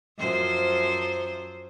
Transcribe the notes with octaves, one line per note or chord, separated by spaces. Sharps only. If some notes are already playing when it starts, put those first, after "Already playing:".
F#2 F3 C5